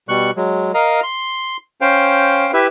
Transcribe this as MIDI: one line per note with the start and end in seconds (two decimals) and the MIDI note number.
0.09 0.31 47
0.09 0.31 55
0.09 0.31 85
0.09 0.31 90
0.36 0.72 54
0.36 0.72 56
0.74 1.00 70
0.74 1.00 75
0.74 1.00 77
0.74 1.00 82
1.03 1.57 84
1.81 2.51 61
1.81 2.51 72
1.81 2.51 77
1.81 2.51 79
2.53 2.67 64
2.53 2.67 67
2.53 2.67 71
2.53 2.67 76